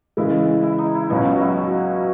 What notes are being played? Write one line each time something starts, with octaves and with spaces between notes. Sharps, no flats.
C#3 E3 G#3 E4
E4
D#4
E4
C#2 B2 F#3 C#4 D#4
F#4
E4
F#3